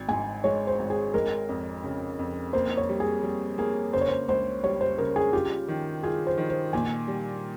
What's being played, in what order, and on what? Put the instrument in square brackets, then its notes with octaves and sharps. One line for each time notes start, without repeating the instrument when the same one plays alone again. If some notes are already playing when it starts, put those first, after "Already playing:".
Already playing: [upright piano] G#1
[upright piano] G#2 [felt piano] G#5
[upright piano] G#3 [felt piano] C#5
[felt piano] C5
[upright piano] G#1
[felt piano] G#4
[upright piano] G#3 [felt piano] A#4
[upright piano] F2
C#3
F2
[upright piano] A#3 [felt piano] C5
[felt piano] C#5
[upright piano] G3
[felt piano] G#4
[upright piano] G3
[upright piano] A#3 [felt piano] G#4
[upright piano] C#3 [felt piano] C5
[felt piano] C#5
C5
[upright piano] C#2 [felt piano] C5
[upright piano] G3 [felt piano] C#5
[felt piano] C5
[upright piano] C#3 [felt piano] A#4
[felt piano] G#4
[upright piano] F4 [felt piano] G4
[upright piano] D#3
[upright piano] F4 [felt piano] G#4
[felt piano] C5
[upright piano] D#3
[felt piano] C5
[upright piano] A#2 [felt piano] G#5
[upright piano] G3